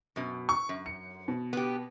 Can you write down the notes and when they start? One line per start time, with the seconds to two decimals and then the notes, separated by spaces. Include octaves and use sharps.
0.16 F#2 B2
0.49 C#6
0.69 F#2
0.86 C#7
1.28 B2
1.53 B3 G4